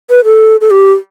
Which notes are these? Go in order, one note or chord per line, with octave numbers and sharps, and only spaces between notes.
B4
A4
A4
G4